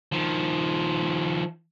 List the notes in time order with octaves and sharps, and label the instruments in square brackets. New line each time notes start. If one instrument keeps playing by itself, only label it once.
[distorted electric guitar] D#3 F3